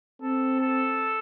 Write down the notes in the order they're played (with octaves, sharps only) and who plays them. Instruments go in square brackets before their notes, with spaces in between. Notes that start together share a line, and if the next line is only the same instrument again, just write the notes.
[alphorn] C4 [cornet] A4
[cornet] A4